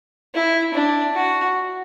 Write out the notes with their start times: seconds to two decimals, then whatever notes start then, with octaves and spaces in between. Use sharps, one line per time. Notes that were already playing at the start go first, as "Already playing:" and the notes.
0.34 E4
0.74 D4
1.15 F#4